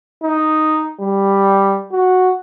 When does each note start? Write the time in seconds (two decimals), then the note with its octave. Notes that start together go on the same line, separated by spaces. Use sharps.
0.23 D#4
1.00 G3
1.92 F#4